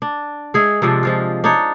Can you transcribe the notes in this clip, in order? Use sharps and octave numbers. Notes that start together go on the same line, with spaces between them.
D4
G#3 G#4 C#5 E5
C3 F3 G#3 D4
F3 G#3 F4
D4 D#4 C#5